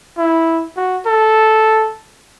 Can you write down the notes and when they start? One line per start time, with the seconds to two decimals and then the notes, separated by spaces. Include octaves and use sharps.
0.18 E4
0.77 F#4
1.06 A4